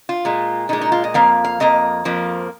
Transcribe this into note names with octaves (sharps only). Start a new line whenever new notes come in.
F4
A#2 G#3
A#2 G#3 D#4
D#4
F4
D#5
F2 F3 A#3 F5
F5
F2 F3 A#3 D#5
F2 F3 A#3